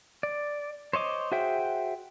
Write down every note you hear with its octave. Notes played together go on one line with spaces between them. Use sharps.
D5
C5 C#5 D#5 D6
F#4 G#4 C5 E5 G5